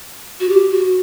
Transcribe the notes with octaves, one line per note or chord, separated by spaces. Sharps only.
F#4
G4
F#4